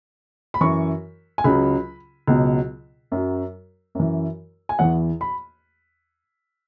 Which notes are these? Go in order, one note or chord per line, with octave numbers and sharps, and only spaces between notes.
B5
F#2 E3 C#6
G#5
C#2 C#3 F#3 B5
C#2 B2 F#3
F#2 F#3
F#2 E3
G#5
E2 E3 F#5
B5